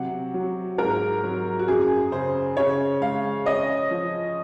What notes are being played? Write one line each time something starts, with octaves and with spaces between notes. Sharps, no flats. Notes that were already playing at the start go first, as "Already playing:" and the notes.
Already playing: C3 F#3 F#5
F#3
G#2 A#4
F#3
F#4
F#2 G#4
C#3 C5
C#3 C#5
G#3 F5
C#4 D#5
F3